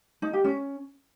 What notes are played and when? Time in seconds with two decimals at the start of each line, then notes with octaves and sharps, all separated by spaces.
0.22 D#4
0.33 G4
0.44 C#4